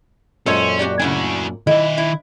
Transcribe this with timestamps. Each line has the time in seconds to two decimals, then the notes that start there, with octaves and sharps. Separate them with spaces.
0.46 F#2 A#2 G#3 C#4 A4 C5 C#5
0.79 F#4 G4 D5
1.00 C#3 D4 E4 F#4 G#5
1.67 D#3 E4 D#5 E5
1.98 E4